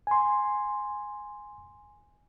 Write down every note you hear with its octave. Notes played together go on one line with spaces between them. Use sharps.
G#5 C6